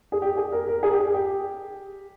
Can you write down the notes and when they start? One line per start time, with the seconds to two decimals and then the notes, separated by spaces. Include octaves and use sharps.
0.12 G#4
0.22 G4
0.37 G#4
0.52 A#4
0.68 A#4
0.83 G#4
0.91 G4
0.99 G#4
1.14 G4